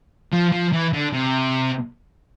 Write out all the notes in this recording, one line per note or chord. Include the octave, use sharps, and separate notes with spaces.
F3
F3
E3
D3
C3